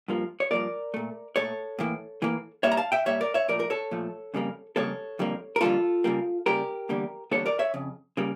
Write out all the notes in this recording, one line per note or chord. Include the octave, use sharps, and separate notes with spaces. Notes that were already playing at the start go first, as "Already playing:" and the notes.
G2 F3 A#3
C#5
G2 F3 A#3 A#4 D5
A#2 A3
A#2 A3 A4 C#5
A2 E3 A#3
A2 E3 A#3
A#2 G3 A#3 C#5 E5
A#5
F5 A5
E5 G5
A#2 G3 A#3 C#5 E5
A#4 D5
C#5 E5
A#2 F3 A3 A#4 D5
A#4
A4 C#5
A#2 F3 A3
F2 C#3 G3 A#3
F2 C#3 G3 A#3 A4 C#5
F2 D3 G3 A#3
A#4
F2 D3 G3 A#3 F4 A4
C#3 G3 A#3
C#3 G3 A#3 G4 A#4
E2 D3 G3 A#3
E2 D3 G3 A#3 A4 C#5
A#4 D5
C#5 E5
F2 C#3
C#3 G3 A#3